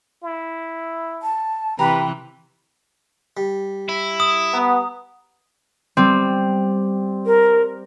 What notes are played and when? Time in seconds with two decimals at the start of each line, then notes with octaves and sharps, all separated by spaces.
0.23 E4
1.23 A5
1.79 C3 E3 G4 B4 A#5 B5
3.37 G3
3.89 E4
4.20 D#6
4.53 B3 A#5
5.97 G3 C4
7.26 A#4